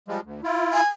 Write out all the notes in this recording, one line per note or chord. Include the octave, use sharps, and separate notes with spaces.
F3 G3 G#3
D2
E4 F4
G#5